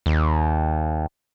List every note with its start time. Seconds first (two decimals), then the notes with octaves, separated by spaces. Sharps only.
0.06 D#2